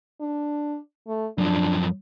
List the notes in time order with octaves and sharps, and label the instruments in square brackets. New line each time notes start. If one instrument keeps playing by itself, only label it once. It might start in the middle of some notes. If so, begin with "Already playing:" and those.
[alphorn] D4
A3
[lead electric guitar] F#2 F3 [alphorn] D4